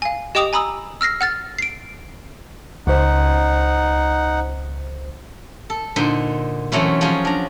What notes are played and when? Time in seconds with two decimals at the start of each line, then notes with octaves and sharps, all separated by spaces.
0.02 F5 G#5
0.35 G4 D#5 G5 D6 D#6 F7
0.53 G#5 A#5 B5 D#6 E6
1.01 E6 F6 A#6 C7
1.21 F#5 F6 A6
1.59 C7 D7
2.87 C#2 D#4 C5 F#5
5.70 A4
5.96 A#2 D3 D#4 C5
6.72 B2 E3 F#3 A3 C4 C#4
7.01 F3 F#3 C#4 G#4
7.25 D4 A#5